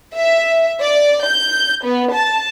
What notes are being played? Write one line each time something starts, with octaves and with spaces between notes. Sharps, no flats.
E5
D5
G6
B3
A5